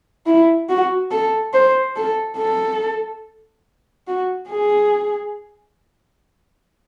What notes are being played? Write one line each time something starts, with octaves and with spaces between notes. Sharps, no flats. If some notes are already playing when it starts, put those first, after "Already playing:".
E4
F#4
A4
C5
A4
A4
F#4
G#4